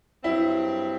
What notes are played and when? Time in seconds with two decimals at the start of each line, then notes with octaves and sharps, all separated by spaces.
0.24 G2 F#3 C4 E4